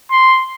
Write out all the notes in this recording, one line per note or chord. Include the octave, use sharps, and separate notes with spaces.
C6